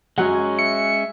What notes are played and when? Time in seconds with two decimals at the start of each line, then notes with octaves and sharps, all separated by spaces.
0.18 F#2 F#3 G#3 C#4 F#5
0.59 E5 C#7